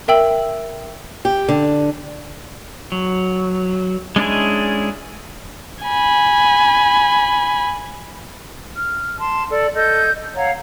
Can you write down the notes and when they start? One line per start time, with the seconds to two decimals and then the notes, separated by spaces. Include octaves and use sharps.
0.08 A#4 E5 G5 E6 F#7
1.25 G4
1.49 D3
2.92 F#3
4.16 G#3 C#4 D4 E4 G#4
5.85 G#5 B5
8.77 F6
9.19 A5 C6
9.51 A4 D5
9.75 A4 D#5 G6
10.35 C#5 F5 F#5 A#5